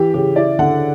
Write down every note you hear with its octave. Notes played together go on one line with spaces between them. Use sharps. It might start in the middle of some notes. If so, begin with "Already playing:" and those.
Already playing: E3 G4
C#3 G4
E4 D5
D3 F#5